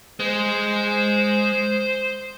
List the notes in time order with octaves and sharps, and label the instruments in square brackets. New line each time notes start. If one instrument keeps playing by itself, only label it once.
[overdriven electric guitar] G#3 [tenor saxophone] C5